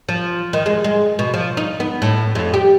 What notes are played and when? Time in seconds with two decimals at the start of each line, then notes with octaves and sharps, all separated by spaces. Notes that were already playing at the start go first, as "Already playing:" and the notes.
0.09 F3
0.53 D#3
0.66 G#3
0.84 G#3
1.19 B2
1.34 F3
1.57 D#4
1.80 B3
2.02 A2
2.35 F2
2.54 G4